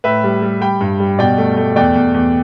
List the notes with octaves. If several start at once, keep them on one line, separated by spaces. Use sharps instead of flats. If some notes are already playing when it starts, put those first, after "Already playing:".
A2 B4 E5
G3
G3
G3 G5 B5
G2
G3
B2 D5 G5
A3
A3
E2 D5 G5
E2
E2